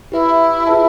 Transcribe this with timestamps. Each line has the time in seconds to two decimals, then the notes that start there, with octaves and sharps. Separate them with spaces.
0.12 E4 G4 B4 E5
0.67 F4 G#4 B4 E5 A5